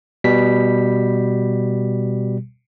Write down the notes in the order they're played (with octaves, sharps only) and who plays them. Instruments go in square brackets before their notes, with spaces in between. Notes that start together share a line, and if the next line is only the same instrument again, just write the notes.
[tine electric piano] B2 G3 B6